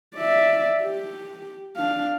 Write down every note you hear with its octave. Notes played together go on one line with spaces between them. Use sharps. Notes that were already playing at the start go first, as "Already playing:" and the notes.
D5 E5
G4
D4 F5